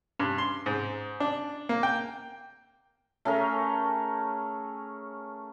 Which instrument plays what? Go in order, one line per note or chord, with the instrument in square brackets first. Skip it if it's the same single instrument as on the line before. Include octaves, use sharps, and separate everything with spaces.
[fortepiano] G2
C6
G#2
D4
A#3
G5
[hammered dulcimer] A3 C#4 G#4 A#4